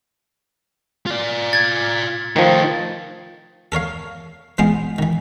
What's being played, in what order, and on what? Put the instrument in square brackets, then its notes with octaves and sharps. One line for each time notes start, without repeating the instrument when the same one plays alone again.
[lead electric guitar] F4 D5
[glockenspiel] G#6 A6
[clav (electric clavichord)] D#3 F3 [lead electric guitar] A3 D#4
[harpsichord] A4 A#4 C#5 F5
E3 G#3 B3 F4 G#4 C5
D#3 E3